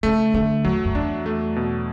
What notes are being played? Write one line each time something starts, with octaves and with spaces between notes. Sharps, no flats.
C#3 A3
D3 A3
E2 F#3
F#2
E2 D4
A3
B2